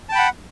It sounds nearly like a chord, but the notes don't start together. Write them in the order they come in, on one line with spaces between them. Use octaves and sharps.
A5 G5 B5 F#5